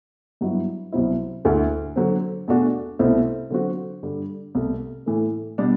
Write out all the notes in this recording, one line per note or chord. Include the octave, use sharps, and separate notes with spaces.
G2 F#3 B3 E4
C2 B2 F#3 C4 E4
D2 D3 A3 E4
D3 F#3 C4
E2 B2 A3 D4 F#4
C2 B2 A3 C4 E4
D3 F#3 C4 F#4
G2 D3 G3
C2 B2 A3
A2 E3 A3
B2 G3 D4